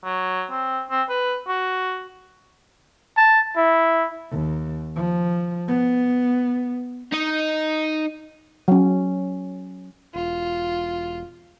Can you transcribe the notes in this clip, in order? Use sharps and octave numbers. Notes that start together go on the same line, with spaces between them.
F#3
C4
C4
B4
F#4
A5
E4
D#2
F3
B3
D#4 D#5
F#3 C#4
E1 F4